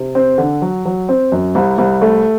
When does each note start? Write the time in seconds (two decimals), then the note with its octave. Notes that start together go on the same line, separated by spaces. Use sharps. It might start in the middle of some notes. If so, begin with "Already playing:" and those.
Already playing: C3
0.15 C4
0.38 D3
0.62 F#3
0.85 F#3
1.09 C4
1.32 F#2
1.55 C2
1.78 C2
2.02 A3